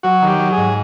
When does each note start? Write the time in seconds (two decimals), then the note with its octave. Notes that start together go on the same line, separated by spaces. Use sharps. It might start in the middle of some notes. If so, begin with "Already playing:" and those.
0.03 F#3 F#4
0.22 D#3 G4
0.40 F#3
0.52 G#4
0.57 G#2